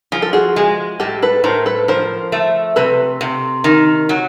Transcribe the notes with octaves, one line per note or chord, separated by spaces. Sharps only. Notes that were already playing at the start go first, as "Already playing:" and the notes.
F3 G#4
A4
F#4 G#4
G#3
A2 G4 A4
A4 B4
A2 A#4 C5
A4 B4
F3 A#4 C5
A3
C3 A4 B4
C3
D#3
F#3